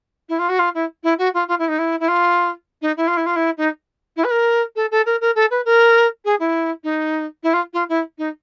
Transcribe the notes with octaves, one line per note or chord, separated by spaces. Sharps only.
E4
F4
F#4
F4
E4
E4
F#4
F4
F4
E4
D#4
E4
E4
F4
D#4
E4
F4
E4
F4
E4
D#4
E4
B4
A#4
A4
A4
A#4
A#4
A4
B4
A#4
G#4
E4
D#4
E4
F4
F4
E4
D#4